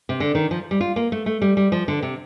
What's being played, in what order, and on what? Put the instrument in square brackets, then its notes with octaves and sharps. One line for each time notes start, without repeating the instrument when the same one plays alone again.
[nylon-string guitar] C3
D3
D#3
F3
G3
F4
A#3
A3
A3
G3
G3
F3
D3
C3